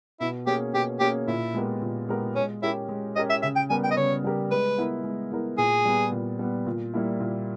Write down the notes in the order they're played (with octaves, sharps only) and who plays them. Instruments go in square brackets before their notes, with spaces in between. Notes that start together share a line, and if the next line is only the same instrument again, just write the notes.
[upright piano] B2 [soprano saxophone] E4
[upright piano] A#3 C#4 G#4 [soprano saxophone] G4
[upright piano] B2 [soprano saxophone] G4
[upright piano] A#3 C#4 G#4 [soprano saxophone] G4
[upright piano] A#2 [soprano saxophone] E4
[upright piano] G#3 B3 G4 A#4
A#2
G#3 B3 G4 A#4
[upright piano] G#3 [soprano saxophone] C#4
[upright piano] C#4 G4 A#4 [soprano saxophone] E4
[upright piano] G#3
[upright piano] C#4 G4 A#4 [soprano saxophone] D#5
[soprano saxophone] E5
[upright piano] C#3 [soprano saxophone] E5
[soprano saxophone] G5
[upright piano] G3 B3 G4 A#4 [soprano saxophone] G#5
[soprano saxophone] G5
D#5
[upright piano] C#3 [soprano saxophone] C#5
[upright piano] G3 B3 G4 A#4
[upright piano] G#3 [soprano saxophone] B4
[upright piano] B3 E4 A#4
G#3
B3 E4 A#4
[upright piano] A#2 [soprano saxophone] G#4
[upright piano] G3 B3
A#2
G3 B3
A#2
G3 A#3 E4
A#2